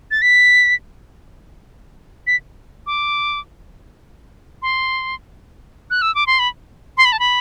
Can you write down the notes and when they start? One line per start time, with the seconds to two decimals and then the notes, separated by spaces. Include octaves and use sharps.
0.11 A6
0.22 B6
2.27 B6
2.87 D6
4.62 C6
5.91 F#6
6.02 E6
6.15 D6
6.27 C6
6.39 B5
6.97 C6
7.05 B5
7.12 A5
7.19 B5